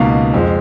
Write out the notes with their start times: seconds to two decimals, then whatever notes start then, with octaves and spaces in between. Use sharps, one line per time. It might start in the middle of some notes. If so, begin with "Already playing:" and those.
Already playing: C#2 B2 A#3 D#4 F5
0.34 F2 F3 G#3